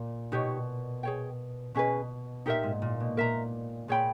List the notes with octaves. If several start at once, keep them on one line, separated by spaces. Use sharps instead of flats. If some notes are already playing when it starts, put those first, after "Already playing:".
Already playing: A#2
B2 D#4 G4 C#5
G#4 C#5 G5
B2 C#4 G#4 B4
A#2 D#4 G4 A#4 E5
G#2
A#2
B2
A#2 A#4 E5 A#5
A#2 G#4 C#5 G5 B5